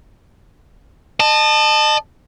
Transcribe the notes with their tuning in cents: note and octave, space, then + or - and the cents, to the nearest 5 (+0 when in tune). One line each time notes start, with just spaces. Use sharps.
D#5 -35 A5 +0